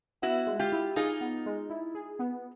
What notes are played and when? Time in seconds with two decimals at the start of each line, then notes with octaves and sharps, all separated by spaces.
0.22 B3 E4 F#4
0.47 G#3
0.59 F4 G4
0.72 E4
0.96 D#4 F4 G#4
1.21 B3
1.46 G#3
1.70 E4
1.95 G#4
2.19 B3